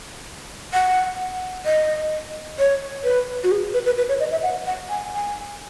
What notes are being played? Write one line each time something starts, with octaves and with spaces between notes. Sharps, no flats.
F#5
D#5
C#5
B4
F#4
G#4
B4
B4
B4
C#5
D#5
E5
F#5
F#5
G#5
G#5